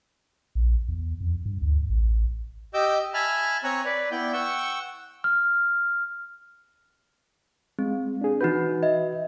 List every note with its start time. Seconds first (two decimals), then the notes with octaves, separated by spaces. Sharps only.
0.55 A#1
0.88 E2
1.21 F2
1.45 G2
1.61 D2
1.89 A1
2.74 G4 D#5 D6 E6 G6
3.14 E5 G#5 A5 B5 F6
3.64 C4 C#5 G#5 A#5 C#6 F#6
3.85 B4 D5
4.12 B3 E4 D5 G5 G6
4.33 F#5 G5 C#6 E6
5.24 F6
7.79 G#3 C4
8.21 D4 G#4
8.41 E3 D#4 F#4 B4 G6
8.83 D#5 E5